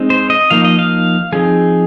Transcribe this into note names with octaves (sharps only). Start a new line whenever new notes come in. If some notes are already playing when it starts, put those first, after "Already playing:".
Already playing: G#3 C4 D#4
C5
D#5
F3 A#3 D#4 F5
D#5
F5
F3 C4 D#4 G#4